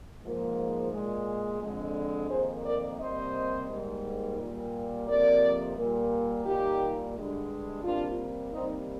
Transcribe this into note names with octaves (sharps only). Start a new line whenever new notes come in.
G#2 F3 A#3
A#2 G#3
F2 D3 G#3
F2 D#3 A#3 G#4 C5
A#4 D5
C3 G3 A#3 C5 D#5
G#2 G3 A#3
A#2 G3 A#3
F2 C3 F3 A#3 A#4 D5
A#2 G3 A#3
A#2 G3 A#3 D#4 G4
G2 D3 G#3
C3 G3 A#3 D4 F4
C3 G3 A#3 C4 D#4